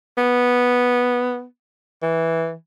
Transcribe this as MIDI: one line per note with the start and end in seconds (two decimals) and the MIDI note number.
0.18 1.45 59
2.03 2.54 52